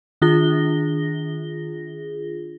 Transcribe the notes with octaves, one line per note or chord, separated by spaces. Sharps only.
D#3 D4 F4 G#4 A#6 G7